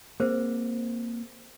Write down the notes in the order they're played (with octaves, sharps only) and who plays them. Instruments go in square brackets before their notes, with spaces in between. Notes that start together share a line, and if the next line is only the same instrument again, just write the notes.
[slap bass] A#3 C4 [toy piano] G#4 A#4 C5